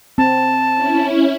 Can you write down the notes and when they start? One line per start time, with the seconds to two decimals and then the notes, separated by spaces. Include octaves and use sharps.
0.18 C4 A5
0.75 C#4 E4